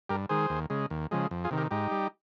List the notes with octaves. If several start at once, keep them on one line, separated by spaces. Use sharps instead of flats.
G2 G4 A#4
D#3 G#3 G#4 C5
D#2
C#3 G#3
D#2
C#3 F3 G#3
F2
F4 G#4
C3 D#3
G4 A#4
G#2 D#4 G4
G3